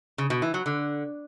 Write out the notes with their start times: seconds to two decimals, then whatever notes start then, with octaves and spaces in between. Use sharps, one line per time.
0.18 C#3
0.30 B2
0.42 E3
0.54 F#3
0.66 D3